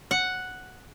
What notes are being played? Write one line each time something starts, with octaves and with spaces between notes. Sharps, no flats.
F#5